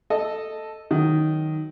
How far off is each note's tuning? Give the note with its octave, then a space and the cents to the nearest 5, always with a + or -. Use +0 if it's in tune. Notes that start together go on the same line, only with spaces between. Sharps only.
A4 +0 D#5 -5
D#3 +0 F#3 +0